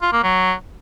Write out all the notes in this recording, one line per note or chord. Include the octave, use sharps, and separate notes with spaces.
F4
A#3
F#3